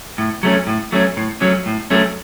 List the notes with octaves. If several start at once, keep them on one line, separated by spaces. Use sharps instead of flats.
A2
F#3 A3 C#4
A2
F#3 A3 C#4
A2
F#3 A3 C#4
A2
F#3 A3 C#4